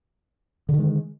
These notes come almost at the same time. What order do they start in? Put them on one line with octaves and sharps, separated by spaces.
D3 D#3 G#3